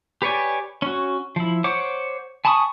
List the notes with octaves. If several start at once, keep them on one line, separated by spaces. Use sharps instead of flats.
G4 B4 C#5 D5 G#5
C#4 F#4
F3 E4
C5 C#5 F#5 D6
G#5 A5 B5 C#6 D#6